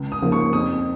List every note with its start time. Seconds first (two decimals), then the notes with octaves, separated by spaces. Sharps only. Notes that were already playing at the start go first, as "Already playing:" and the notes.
Already playing: C#2
0.12 D#6
0.22 C#3 F3 A#3 D#4
0.32 C#6
0.53 F2 D#6